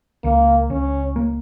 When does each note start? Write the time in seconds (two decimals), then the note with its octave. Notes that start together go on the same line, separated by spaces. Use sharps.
0.24 C#2 A#3
0.70 C#2 C#4
1.16 A#3